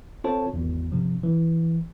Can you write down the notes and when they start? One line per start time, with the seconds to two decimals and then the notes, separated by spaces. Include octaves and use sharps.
0.24 C4 F4 A4 C5 C#5 A5
0.53 G#1 E2
0.92 G2 C3 F3
1.23 E3